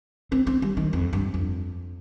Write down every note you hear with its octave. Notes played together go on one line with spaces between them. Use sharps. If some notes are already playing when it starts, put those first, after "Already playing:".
C4
C4
G3
D#3
F2
G2
F2